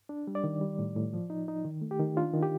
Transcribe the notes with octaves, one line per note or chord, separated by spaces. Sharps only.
D4
G3
D5
D#3
G3
A2
A2
F3
D#4
D#4
D#3
A3
G4
D#3
D4 F4
D#3
G4